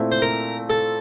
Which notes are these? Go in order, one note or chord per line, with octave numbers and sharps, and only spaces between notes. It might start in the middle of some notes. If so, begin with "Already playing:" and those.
Already playing: A#2 A3 C4 E4
C5
A#4
A4